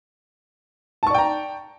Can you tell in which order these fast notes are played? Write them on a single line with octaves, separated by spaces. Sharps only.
A5 C#6 D5 G5 A#5